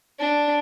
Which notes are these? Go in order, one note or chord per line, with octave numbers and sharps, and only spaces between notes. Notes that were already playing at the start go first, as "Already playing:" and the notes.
D4